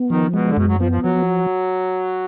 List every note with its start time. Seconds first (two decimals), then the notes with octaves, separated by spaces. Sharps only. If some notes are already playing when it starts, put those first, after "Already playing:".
Already playing: B3
0.10 D#3 F3
0.34 B2 G#3
0.49 D3
0.57 F#2 B2
0.68 F#3
0.80 F3 B3
0.92 F3
1.03 F3 F#3